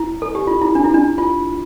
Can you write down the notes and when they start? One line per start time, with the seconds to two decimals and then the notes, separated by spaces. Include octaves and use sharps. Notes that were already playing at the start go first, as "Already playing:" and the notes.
Already playing: E4
0.22 A4
0.35 G4
0.47 F4
0.61 E4
0.75 D4
0.84 E4
0.94 D4
1.18 F4